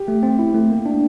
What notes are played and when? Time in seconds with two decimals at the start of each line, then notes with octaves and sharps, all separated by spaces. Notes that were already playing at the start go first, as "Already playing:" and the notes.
Already playing: G4
0.08 A3
0.23 C4
0.39 E4
0.54 A3
0.70 A#3
0.86 D4